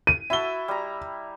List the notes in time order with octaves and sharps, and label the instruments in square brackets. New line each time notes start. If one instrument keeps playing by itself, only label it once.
[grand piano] D#7
[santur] E4 F#4 A5 [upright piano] E5 G7
[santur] G3 A#5